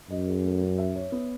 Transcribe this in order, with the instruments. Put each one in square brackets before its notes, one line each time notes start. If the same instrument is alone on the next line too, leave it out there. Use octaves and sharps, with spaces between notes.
[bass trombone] F#2 [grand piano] D#5
[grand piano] G#4
A3
C#4
E5
C#5
B3